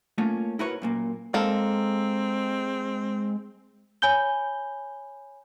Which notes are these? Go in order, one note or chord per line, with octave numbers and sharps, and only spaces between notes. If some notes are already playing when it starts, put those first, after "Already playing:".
A3 A#3 C#4 F4
E4 F#4 A#4 B4 C#5
F#2 A#2 A#3
G#3 A#3 C4 A4
C#5 G#5 B5 G6 G7